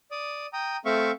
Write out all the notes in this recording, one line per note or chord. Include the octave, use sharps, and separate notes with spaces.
D5 D#6
G5 A#5 D#6
A3 C4 E5 F5 C#6